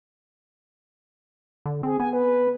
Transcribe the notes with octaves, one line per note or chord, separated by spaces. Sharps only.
D3
C4 G#4
B3 G#5
B4